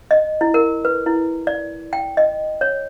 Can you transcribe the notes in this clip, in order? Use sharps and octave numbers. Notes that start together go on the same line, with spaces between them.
D#5
E4
A#4
B4
E4
D5
G5
D#5
C#5